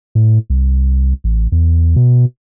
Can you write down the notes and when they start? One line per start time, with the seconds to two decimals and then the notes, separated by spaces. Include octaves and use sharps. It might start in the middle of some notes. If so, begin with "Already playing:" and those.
0.15 A2
0.50 C2
1.24 A1
1.52 E2
1.96 B2